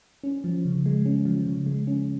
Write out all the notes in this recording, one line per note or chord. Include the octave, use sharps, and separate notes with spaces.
C#4
F3
C#3
G#3
C#4
F3
C#3
G#3
C#4